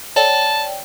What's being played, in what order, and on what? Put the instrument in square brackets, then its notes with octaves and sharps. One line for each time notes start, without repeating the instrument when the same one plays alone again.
[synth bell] C#5 D5 G5 [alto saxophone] A5